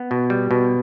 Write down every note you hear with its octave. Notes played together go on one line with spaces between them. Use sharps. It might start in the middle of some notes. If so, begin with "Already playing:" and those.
Already playing: B3
B2
G3
B2